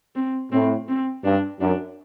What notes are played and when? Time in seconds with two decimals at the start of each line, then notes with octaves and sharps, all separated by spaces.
0.15 C4
0.52 A2 C4
0.88 C4
1.24 G2 D4
1.60 F#2 D4